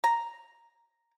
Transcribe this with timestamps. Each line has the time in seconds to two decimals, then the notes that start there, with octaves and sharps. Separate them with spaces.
0.04 A#5